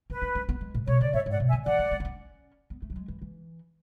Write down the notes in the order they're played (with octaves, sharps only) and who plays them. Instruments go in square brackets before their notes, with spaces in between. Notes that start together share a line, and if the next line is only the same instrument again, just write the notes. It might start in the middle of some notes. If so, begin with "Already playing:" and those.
[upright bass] C#4 [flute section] B4
[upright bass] D4
C#4
B3
G#3
A2
[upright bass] B2 [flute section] C#5
[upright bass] C#3 [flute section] D5
[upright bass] A2 [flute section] C#5 E5
[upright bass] G#2
[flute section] D5 F#5
[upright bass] B2
[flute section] E5 G#5
[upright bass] D3
[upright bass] E3 [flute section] D5 F#5
[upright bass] G#3
A3
D4
C#4
B3
A3
F#3
G#3
E3
E3